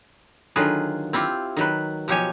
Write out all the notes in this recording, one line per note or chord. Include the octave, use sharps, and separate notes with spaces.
D3 D#3 F#3 F4 G#4 B4
C4 E4 F4 G4
D#3 F#3 B4
B2 F3 F#3 G4 C#5 G#5